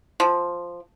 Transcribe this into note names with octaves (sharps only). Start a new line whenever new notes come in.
F3